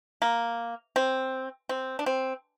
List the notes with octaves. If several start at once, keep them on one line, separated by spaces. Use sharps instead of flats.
A#3
C4
C4
D4
C4